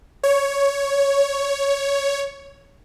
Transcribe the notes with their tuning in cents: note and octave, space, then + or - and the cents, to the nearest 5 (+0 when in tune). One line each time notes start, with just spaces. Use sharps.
C#5 +5